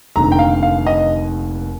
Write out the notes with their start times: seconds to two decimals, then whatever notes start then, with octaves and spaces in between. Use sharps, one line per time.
0.16 F1 D#2 D3 A#5
0.32 G5
0.39 F5
0.63 F5
0.87 D#5